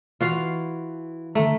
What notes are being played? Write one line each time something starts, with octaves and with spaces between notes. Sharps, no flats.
E3 F4 F#4 F5
D3 D#3 A3 A#5